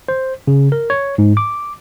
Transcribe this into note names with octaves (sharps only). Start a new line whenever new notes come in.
C5
C#3
A#4
C#5
G#2
D6